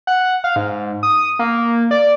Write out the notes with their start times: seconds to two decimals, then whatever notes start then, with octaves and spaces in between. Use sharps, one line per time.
0.07 F#5
0.44 F5
0.56 G#2
1.03 D#6
1.39 A#3
1.91 D5